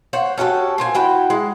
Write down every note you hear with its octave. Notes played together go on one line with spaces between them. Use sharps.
C5 C#5 F#5
C#4 F#4 G4 A4
A#2 C4 G#5
E4 F#4 G5
G#3